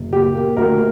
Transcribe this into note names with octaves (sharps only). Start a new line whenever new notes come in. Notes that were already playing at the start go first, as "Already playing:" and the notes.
Already playing: F#1
A#2 G4
A#3
D2 A#4